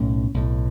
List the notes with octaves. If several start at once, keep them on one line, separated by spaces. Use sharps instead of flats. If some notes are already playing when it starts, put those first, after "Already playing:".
Already playing: B1 A2 C#4
B1 A2